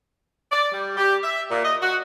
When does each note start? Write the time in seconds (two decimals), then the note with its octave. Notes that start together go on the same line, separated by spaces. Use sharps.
0.52 D5
0.72 G3
0.97 G4
1.23 E5
1.51 A#2
1.64 D#5
1.81 F#4